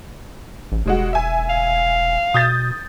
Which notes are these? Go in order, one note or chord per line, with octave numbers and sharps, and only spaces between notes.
A1
E1 G3 G#3 F#4
E5 G#5
F5
B2 D#6 G6 A6